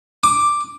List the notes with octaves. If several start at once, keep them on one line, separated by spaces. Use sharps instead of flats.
D6